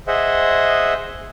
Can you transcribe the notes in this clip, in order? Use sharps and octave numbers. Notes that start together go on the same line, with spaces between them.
G#4 C5 D#5 E5 F#5